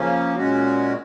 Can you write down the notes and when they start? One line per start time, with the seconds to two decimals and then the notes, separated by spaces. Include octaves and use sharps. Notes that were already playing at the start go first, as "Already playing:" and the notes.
Already playing: C#3 F3 A#3 C#4
0.36 A#2 G#3 C#4 F#4